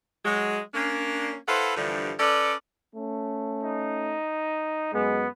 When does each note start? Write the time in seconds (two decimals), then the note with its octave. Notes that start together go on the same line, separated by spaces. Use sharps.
0.25 F#3 G#3
0.74 A#3 C#4 D4
1.48 E4 A4 B4 C5 F5 F#5
1.76 G2 D3 E3 F3 G3
2.19 C#4 A4 B4 D5
2.96 A3 C#4
3.63 D#4
4.94 F#2 G#3 B3